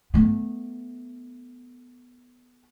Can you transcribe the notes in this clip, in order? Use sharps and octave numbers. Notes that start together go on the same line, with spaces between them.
A3 B3